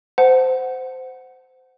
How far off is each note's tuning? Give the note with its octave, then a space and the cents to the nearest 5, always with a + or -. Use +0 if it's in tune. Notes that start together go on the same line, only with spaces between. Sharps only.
C5 -20 F#5 +0 A5 +0